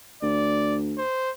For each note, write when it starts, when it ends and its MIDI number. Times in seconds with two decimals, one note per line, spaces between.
0.22 1.00 38
0.22 0.77 74
0.98 1.30 72